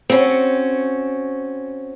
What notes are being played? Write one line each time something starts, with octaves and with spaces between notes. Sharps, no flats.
C4 C#4 F#4